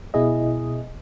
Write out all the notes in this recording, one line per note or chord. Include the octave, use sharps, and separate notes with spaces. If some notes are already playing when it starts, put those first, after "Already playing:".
B2 E4 G#4 D#5